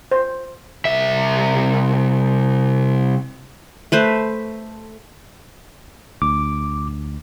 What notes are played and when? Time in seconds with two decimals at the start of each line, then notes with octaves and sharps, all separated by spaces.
0.11 C5
0.85 C2 E5
3.92 A3 B4 C5
6.22 D2 D6